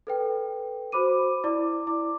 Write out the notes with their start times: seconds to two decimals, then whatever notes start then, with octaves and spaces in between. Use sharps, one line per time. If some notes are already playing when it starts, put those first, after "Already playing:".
0.07 A4 B4 G5
0.92 F#4 C5 B5 D6 D#7
1.44 E4 D5 D6
1.87 E4 D6